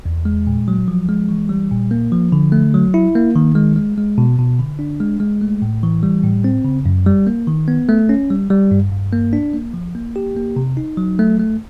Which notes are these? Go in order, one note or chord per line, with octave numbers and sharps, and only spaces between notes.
E2
G#3
A#2
F#3
F3
G#3
E3
G3
A#2
A#3
F3
D3
A3
F#3
E4
A#3
D#3
G#3
G#3
G#3
B2
B2
D3
D4
G#3
G#3
A3
A2
E3
G3
A2
C4
C#3
F#2
G3
A#3
D#3
B3
A3
C#4
G3
G3
G2
G2
A#3
D4
A#3
F3
A#3
G4
A#3
C3
D#4
F#3
A3
A3